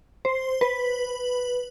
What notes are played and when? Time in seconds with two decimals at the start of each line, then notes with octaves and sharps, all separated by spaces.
0.25 C5
0.61 B4